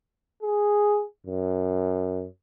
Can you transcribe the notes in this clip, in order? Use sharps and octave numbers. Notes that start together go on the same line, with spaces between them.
G#4
F#2